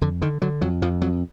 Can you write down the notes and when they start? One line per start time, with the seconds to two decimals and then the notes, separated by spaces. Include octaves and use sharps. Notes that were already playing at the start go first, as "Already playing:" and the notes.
0.01 F2 D3
0.22 D3 D#3
0.42 D3 F#3
0.61 F2 F#3
0.82 F2 F3
1.02 F2 F#3